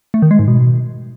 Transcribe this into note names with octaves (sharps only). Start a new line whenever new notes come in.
A3
D#3
G#3
G#2
B2